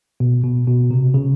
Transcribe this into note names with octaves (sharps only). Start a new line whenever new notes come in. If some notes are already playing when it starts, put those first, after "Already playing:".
B2
B2
B2
C3
C#3